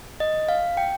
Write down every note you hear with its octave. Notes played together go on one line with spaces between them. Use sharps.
D#5
F5
G5